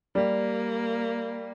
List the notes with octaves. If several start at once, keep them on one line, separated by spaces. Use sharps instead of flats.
G3 A#3